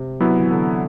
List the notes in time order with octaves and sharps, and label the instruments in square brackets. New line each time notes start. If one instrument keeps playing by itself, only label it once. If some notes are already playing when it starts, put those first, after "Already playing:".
Already playing: [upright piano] C3
[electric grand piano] F#3 B3 E4
[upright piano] E3
D3